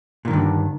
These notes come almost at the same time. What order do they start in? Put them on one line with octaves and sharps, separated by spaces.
A#2 D#3 G2 D3